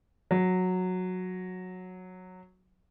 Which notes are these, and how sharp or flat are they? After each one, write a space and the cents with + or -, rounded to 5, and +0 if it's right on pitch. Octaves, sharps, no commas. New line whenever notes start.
F#3 -10